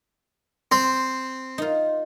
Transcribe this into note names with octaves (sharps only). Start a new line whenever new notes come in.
C4 C5
D#4 F4